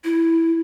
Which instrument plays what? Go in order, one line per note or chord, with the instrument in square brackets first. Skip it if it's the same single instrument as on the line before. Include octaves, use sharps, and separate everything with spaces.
[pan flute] E4